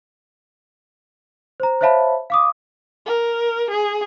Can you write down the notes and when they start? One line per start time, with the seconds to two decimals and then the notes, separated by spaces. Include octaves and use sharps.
1.60 C5 A#5
1.81 C5 C#5 E5 F5 A5 B5
2.30 F5 D6 D#6
3.06 A#4
3.70 G#4